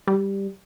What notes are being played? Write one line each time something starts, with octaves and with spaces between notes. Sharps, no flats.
G3